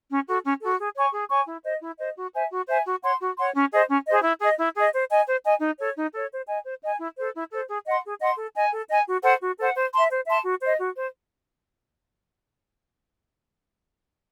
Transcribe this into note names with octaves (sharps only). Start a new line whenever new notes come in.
C#4
F#4 A4
C#4
F#4 A4
G#4
C#5 G#5 C#6
G#4
C#5 G#5 C#6
E4
C5 D#5
E4
C5 D#5
F#4
C5 E5 G#5
F#4
C5 E5 G#5
F#4
C#5 F#5 C6
F#4
C#5 F#5 C6
C#4
G#4 C5 D#5
C#4
G#4 C5 D#5
E4
G#4 D#5
E4
G#4 D#5
C5
D#5 G#5
C5
D#5 G#5
D#4
A4 C#5
D#4
A4 C#5
C5
D#5 G#5
C5
D#5 G#5
E4
A4 C5
E4
A4 C5
G#4
D#5 F#5 C6
G#4
D#5 F#5 C6
A4
D#5 G#5
A4
D#5 G#5
F#4
A4 C5 F#5
F#4
A4 C5 F#5
C5
E5 A5 C6
C5
E5 A5 C6
F#4
C5 D#5
F#4
C5